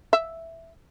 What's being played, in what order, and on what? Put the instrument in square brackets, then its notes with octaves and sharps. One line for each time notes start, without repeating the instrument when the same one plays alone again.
[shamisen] E5